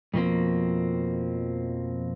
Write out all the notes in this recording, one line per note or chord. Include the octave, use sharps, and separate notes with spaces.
F2 B2 F3 A#3 C4